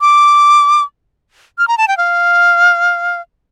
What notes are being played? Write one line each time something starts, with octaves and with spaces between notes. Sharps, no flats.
D6
F6
A#5
A5
G5
F5